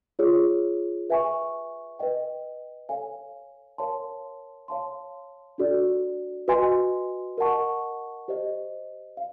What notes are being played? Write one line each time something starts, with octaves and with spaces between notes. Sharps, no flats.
F4 G#4 C#5
B4 E5 G#5 C#6
B4 D#5 G5
A4 C#5 F5 G#5
A#4 C#5 F5 A5 C6
C#5 F5 A5 C6
D4 F#4 A4 D5
F#4 B4 D#5 G#5 C6
A#4 D#5 F#5 A5 C#6
G4 C5 D#5
F5